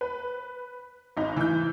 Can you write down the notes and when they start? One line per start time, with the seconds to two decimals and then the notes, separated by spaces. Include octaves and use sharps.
0.01 B4
1.17 G#1 D#4
1.36 E3 G6